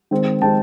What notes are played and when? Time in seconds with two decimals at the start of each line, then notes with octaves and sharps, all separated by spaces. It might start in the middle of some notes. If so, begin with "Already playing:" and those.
0.11 D#3 G#3 C4
0.41 D#3 G#3 C4 G5 A5